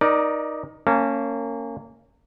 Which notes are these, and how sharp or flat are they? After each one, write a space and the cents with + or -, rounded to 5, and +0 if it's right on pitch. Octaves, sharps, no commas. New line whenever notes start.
D#4 +0 A#4 +30 D5 +5
A#3 -25 C#4 -5 A5 +0